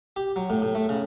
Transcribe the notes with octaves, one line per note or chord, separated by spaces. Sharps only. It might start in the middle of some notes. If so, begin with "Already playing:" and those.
G4
F#3
A2
A2
A3
C#3